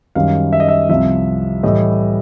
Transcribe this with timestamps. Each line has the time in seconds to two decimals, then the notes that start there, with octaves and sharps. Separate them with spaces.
0.15 F#2 D#3 G3 F5
0.53 E5
0.60 D#5
0.68 E5
0.89 C2 C3 F3 E5
1.63 A2 E3 G3 D#5